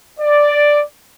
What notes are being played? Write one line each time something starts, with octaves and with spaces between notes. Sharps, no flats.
D5